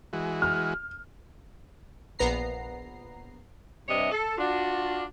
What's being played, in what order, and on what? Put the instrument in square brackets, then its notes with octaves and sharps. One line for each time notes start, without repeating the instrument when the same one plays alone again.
[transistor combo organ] E3 G#3 F#4
[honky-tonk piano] F6
[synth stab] A#1 B3 A#5 C7
[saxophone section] G2 C3 D4 C#5 D#5 E5
A4
D4 F4 F#4